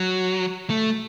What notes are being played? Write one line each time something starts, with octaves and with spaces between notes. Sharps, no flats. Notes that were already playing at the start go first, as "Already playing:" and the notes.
Already playing: F#3
A3